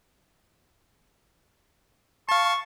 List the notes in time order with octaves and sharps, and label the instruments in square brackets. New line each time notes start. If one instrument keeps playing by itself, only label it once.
[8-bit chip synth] F5 A5 [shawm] C#6